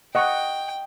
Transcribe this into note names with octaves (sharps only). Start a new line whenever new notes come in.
D#5 F#5 G5 C#6